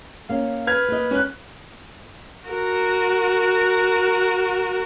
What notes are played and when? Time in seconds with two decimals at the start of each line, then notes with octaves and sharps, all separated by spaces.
0.29 A#3 C#4 F5
0.67 B4 F6 G#6 F7
0.88 A#3 D#5
1.11 C#4 F#6
2.49 F#4 A#4